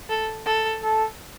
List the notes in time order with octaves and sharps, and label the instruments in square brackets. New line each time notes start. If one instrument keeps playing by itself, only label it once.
[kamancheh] A4
A4
[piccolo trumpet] A4